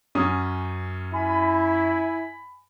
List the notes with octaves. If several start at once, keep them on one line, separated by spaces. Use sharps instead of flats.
F#2 C#4 D#6
E4 G#5 B5